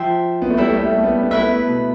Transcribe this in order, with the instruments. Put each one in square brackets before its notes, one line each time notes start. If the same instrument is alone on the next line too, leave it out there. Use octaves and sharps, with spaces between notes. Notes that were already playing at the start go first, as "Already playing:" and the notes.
Already playing: [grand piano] F3 [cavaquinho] C5 E5 G5
[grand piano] B3
A3
[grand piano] G3 [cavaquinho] E4 A4 E5
[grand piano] A3
G3
A3
B3
A3
B3
[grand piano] A3 [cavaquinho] E4 B4 E5
[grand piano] B3
A3
B2